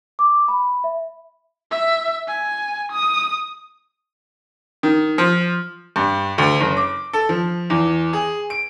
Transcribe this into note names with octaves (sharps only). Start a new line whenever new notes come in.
D6
B5
E5
E5
G#5
D#6
D#3
F3
G2
D2
F#1
D6
A4
F3
E2
G#4
D7